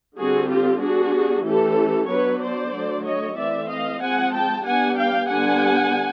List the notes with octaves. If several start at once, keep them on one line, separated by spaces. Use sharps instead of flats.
D3 G3 C4 F#4 G#4
F4 G4
G3 B3 D4 F#4 G#4
E3 A3 C#4 G4 A4
F#3 B3 D4 B4 C#5
C5 D5
D3 F#3 A3
C#5 D#5
E3 A3 C4 D5 E5
D#5 F5
F3 G#3 C4 F#5 G#5
G5 A5
G3 B3 D4 F#5 G#5
F5 G5
D3 G3 B3 D4 F#5 G#5